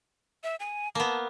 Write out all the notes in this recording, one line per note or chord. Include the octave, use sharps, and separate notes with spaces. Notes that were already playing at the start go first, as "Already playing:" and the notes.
E5
G#5
A#3 B3 A5